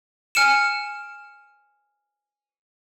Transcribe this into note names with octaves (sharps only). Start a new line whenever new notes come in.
G#5 F6 C#7 D7 E7